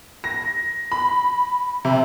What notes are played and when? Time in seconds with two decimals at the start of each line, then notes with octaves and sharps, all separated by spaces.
0.24 A#6
0.92 B5
1.85 C3